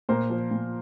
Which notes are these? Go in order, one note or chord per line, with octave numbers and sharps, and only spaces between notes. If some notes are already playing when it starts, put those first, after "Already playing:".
A#2 A#4 C5
F3
A#2